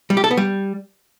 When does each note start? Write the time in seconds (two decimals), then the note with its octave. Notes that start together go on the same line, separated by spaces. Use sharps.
0.10 G3
0.17 G4
0.24 A4
0.31 B3
0.37 G3